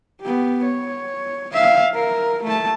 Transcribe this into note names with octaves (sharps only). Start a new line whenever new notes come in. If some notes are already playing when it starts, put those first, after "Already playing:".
B3 G4
C#5
E5 F5
A#4
A3 A5